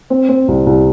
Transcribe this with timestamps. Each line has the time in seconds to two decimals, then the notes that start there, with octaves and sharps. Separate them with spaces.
0.10 C4
0.29 C4
0.48 C2
0.66 C2